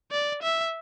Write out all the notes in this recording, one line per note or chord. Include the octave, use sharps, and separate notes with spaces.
D5
E5